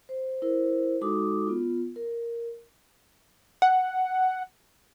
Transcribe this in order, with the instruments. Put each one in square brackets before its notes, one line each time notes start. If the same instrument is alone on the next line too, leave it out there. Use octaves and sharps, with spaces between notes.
[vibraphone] C5
E4 A#4 C5
G#3 D#4 F#4 A4 D6 D#6
B3 F4
A#4
[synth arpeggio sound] F#5